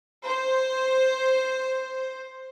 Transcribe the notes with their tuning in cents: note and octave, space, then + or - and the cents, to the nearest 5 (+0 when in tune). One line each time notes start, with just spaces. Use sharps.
C5 +5